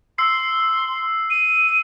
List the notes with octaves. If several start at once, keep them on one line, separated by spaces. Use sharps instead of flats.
C6 E6 C7
D#7